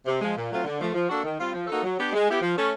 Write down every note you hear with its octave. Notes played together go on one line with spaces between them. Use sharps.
C3
F3 G#3
A#2
F#3 A3 C4 F4
D3
F3 A3
F3
A#3 D4 F#4 A4
D#3
G3 C4 F4
F3
A#3 D#4 F#4 A4
F#3
B3 D4 G4
G#3
B3 E4 G4
F3
A3 C#4